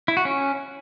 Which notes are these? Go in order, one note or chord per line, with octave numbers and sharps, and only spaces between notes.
E4
F#4
C#4